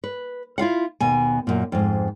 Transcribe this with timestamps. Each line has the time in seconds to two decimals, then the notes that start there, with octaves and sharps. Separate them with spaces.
0.04 B4
0.58 E4 F4 F5 F#5
1.01 D#2 B2 G#5
1.47 F#2 A#2
1.72 F2 G#2